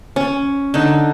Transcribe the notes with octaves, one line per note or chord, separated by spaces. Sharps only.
C#4
D3 D#4